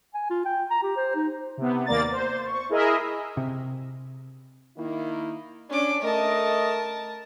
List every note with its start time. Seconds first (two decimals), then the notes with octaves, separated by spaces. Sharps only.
0.14 G#5
0.30 F4
0.45 G5
0.70 A#5
0.83 G4
0.97 C5
1.15 D#4
1.57 C3 B3
1.86 D#2 A#3 D5 A#5 A6
2.11 C5
2.46 C#6
2.69 E4 G#4 A#4 D#5 E5
3.37 C3
4.78 D#3 A#3 E4
5.70 C#4 D4 D6
6.02 A3 A#4 D#5 A5